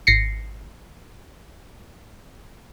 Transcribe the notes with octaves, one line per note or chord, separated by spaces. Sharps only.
G#1 A#6 C7 C#7